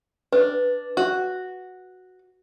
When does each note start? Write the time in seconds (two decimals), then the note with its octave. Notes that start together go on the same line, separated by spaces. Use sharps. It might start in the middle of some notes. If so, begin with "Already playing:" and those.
0.32 D4 B4
0.97 F#4